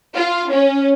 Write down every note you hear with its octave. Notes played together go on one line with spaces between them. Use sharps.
F4
C#4